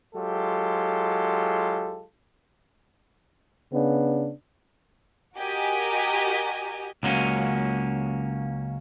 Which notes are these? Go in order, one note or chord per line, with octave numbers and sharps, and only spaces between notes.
F#3 G#3 F4 G4 A4
C#3 B3 D4
F#4 G4 A#4 D#5 G#5
C#2 F#3 A#3 C#4